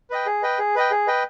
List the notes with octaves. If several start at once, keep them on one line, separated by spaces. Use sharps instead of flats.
B4 D#5 G5
G#4
B4 D#5 G5
G#4
B4 D#5 G5
G#4
B4 D#5 G5